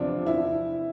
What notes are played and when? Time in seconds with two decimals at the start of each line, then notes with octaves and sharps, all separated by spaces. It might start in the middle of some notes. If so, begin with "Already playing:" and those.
Already playing: E2 C3 F3 C4 D4
0.26 E4